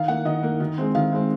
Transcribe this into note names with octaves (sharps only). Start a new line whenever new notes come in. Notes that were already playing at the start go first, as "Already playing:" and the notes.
Already playing: D#3 F5
A#3 F#5
D#3 D#5
A#3
D#3
G#3 C4
D#3 F5
G#3 C4